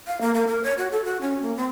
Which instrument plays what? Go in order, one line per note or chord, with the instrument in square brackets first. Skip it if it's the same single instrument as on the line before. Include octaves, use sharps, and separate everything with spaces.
[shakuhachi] F5
A#3
A#3
A#4
C#5
F#4
A4
F#4
C#4
A#3
C4